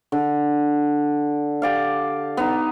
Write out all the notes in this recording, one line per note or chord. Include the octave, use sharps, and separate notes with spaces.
D3
G4 D5 F5
B3 D#4